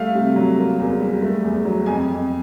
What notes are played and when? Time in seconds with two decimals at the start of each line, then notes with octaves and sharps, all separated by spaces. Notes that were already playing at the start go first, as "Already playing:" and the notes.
Already playing: G3 A3 F5
0.15 C3
0.36 F#3
0.58 A#3
0.79 E2
1.00 G3
1.22 A3
1.44 E2
1.65 F#3
1.86 F2 G#5
2.08 F2